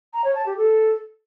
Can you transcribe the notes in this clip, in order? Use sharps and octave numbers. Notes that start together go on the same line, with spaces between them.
A#5
C#5
A5
G4
A4